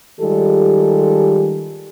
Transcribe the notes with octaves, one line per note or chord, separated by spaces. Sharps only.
D#3 G3 G#3 F4 G4 A4